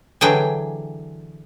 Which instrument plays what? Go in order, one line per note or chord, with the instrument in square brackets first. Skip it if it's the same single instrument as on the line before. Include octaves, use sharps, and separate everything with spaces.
[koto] D3 E3 F#3 G#4 G5